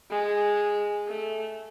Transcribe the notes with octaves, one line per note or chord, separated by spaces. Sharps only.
G#3
A3